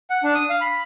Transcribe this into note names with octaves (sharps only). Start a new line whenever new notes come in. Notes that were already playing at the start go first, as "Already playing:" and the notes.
F#5
D4
D#6
F5
B5